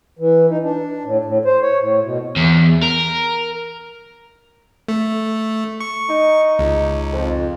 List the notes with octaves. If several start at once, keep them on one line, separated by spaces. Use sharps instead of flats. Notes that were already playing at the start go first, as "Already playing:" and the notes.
E3
D#4
D4
A2
A2
C5
C#5
A2
B2
E2
A#4
A3
C#6
D#4
C#2
F2